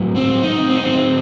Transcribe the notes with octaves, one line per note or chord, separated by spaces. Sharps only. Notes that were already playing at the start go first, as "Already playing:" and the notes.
Already playing: A2 F#3
C4
D#4
C4
D#4
C4